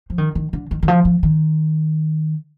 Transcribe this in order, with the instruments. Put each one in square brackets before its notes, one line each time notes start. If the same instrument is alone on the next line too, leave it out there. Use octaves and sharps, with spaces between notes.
[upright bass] F3
D#3
D#3
D3
D#3
D#3
F3
F3
D#3